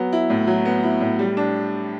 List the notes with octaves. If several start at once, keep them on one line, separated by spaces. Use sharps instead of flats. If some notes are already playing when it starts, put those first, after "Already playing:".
Already playing: F#3 B3
E4
A2
F#3
B3
E4
A2
G3
D4